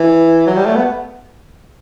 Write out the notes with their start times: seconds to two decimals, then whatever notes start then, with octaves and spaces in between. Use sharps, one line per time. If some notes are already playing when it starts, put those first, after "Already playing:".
Already playing: E3
0.47 F#3
0.56 G3
0.66 A3
0.75 B3